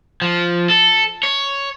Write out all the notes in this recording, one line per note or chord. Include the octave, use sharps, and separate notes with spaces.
F3
A4
C#5